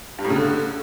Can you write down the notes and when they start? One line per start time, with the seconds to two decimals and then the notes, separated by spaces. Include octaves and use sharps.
0.19 G2
0.24 A2
0.30 C#3
0.36 D3